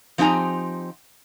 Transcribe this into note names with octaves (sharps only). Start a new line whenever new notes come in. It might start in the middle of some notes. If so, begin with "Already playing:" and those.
F3 C4 D#4 G4 G#5 A#5